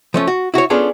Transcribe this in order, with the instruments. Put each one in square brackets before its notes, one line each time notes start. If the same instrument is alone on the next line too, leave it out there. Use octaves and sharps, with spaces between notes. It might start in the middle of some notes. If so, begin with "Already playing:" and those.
[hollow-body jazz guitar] F3 A3 C#4
F#4
E4 F#4 A4 C#5
B3 C#4 D4 F4 G#4 A4